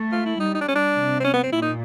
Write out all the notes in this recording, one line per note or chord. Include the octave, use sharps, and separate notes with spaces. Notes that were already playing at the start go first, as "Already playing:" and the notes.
Already playing: A3
F4
E4
G3 D#4
D#4
D4
C#4
D4
C3
C4
C#4
B3
C4
A#2 E4
D#4